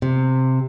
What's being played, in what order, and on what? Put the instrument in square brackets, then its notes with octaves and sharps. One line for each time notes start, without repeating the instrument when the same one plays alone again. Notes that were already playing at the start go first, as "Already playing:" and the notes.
[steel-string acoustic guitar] C3